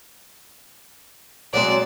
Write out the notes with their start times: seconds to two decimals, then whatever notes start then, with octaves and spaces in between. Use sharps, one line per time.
1.54 F#3 G#3 C4 D5